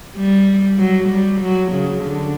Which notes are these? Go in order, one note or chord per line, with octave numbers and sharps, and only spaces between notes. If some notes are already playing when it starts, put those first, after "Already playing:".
G3
F#3
G3
F#3
C#3
D3